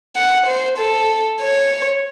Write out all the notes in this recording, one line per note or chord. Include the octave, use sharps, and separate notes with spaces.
F#5
C5
A4
C#5